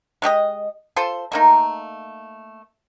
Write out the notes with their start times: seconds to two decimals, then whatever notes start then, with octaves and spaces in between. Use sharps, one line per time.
0.22 G#3 A3 G4 D#5
0.96 F4 A4 C5
1.32 A3 A#3 D#4